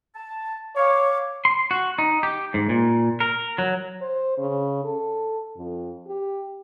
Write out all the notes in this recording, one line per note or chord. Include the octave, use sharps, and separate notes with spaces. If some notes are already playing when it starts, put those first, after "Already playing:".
A5
C#5 F5 D6
C6
F#4
D#4
G4
G#2
A#2
A#4
F#3
C5
C#3
A4
F2
G4